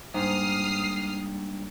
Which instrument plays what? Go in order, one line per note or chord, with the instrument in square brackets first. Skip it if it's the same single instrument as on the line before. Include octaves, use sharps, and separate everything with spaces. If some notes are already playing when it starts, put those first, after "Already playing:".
[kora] G#2 [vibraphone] G3 A#3 D4 [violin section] D#6 F6 C7